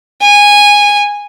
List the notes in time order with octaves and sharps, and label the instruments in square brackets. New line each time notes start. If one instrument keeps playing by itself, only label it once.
[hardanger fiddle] G#5